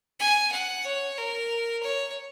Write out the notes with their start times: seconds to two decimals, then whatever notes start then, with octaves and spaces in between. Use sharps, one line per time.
0.19 G#5
0.52 F#5
0.85 C#5
1.18 A#4
1.83 C#5